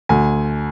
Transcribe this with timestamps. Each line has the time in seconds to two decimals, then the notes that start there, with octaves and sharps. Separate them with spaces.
0.09 D2 G#5